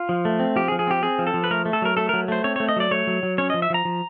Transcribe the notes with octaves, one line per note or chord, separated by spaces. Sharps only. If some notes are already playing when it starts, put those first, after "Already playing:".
Already playing: F4
F3
A3
C4
F3 G4
G#4
F3
G#4
C4 G4
C4 G#4
F3
A4
F3
B4
A3 A#4
A3
A4
F#3 A#4
A3 A4
F#3 A#4
A3 C5
C4 C#5
A3 C#5
D#5
F#3 D5
A3 C#5
F#3
F#3
C#4 C#5
F3 D#5
E5
F3 A#5
F3